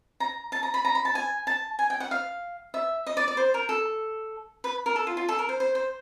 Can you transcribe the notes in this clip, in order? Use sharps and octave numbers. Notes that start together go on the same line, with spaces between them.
A#5
A5
A#5
B5
A#5
B5
A5
G#5
A5
G#5
G5
F#5
F5
E5
D#5
D5
D5
C5
A#4
A4
B4
A#4
A4
F4
F4
A4
A#4
C5
C5
C5